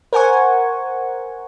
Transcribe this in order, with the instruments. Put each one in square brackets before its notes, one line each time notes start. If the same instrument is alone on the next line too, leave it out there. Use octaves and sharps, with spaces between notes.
[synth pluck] A#4 C5 F#5 G#5 C#6